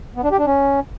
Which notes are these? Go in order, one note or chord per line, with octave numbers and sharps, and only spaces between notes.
B3
D4
G4
D4
C#4